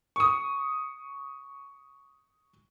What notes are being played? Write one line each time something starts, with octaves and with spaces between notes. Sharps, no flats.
C#6 D#6